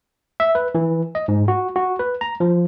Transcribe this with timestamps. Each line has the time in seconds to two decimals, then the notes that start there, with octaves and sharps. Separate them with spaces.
0.40 E5
0.55 B4
0.75 E3
1.15 D#5
1.28 G#2
1.48 F#4
1.76 F#4
1.99 B4
2.21 A#5
2.40 F3